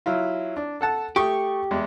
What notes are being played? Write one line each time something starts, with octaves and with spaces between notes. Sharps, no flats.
F#3 E4 F4
D4
A4 F#5 A5
A3 G4 C#6 D#6
E2 G#3